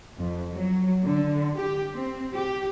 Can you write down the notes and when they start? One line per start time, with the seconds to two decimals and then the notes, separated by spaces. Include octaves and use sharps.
0.19 F2
0.53 F#3
1.04 D3
1.57 G4
1.94 C4
2.34 G4